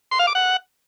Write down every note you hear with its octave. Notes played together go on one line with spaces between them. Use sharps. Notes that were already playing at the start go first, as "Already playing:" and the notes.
C6
F5
D6
F#5